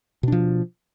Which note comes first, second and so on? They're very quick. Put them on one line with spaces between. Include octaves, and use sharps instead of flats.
B2 D4 F3